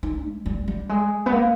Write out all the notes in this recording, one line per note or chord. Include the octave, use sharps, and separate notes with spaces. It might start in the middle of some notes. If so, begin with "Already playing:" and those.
D#4
G#3
G3
G3
G#3
B3
A#3